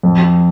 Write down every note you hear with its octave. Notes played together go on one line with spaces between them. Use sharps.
F2